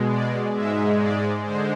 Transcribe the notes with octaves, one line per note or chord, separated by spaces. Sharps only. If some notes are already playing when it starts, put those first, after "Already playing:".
Already playing: B2 G#3
D5
G#2 G#3 E5
D5
D3 G#3 C5